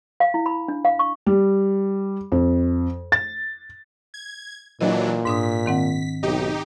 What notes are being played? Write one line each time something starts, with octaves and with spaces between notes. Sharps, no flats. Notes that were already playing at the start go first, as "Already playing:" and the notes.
F5
E4
B5
D4
F5
C#6
G3
F2
A6
G#6
A#2 E3 F#3 D4 D#5
G#2 D4 D#6 B6
D#3 C4 F#5
B1 D#4 G4